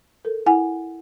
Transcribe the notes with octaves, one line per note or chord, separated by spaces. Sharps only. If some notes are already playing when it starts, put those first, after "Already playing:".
A4 A#4
E4 F#5 G#5